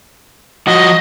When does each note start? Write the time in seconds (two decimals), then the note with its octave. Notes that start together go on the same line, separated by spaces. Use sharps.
0.67 F3 F#4 D#5